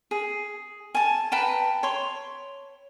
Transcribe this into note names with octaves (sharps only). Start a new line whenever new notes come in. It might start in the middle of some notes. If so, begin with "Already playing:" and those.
G#4
G#5 A5
B4 G5 A5 A#5
C#5 C6